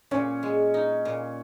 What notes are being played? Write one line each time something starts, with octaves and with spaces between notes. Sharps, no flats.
A#2 C#4
G#3
D#4
A#2